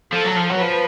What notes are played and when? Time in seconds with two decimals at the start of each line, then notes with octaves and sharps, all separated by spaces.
0.12 F3 A4
0.25 F#3
0.37 F3
0.50 F#3
0.57 F3 B4